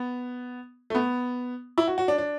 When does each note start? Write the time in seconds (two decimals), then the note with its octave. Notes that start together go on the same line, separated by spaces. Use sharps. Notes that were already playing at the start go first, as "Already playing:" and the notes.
Already playing: B3
0.90 A3
0.95 B3
1.78 E4
1.88 F#4
1.98 F#4
2.08 D4
2.18 D4